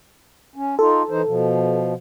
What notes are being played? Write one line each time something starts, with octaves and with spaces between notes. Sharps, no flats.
C#4
D#4 F4 A4
E3 D#4 C5
B2 F3